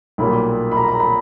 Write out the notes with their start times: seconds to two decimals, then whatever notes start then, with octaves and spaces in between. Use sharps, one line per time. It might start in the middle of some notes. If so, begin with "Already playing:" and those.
0.18 B1 A#2 G3 B5
0.71 B5
0.77 A#5
0.88 A#5
1.00 B5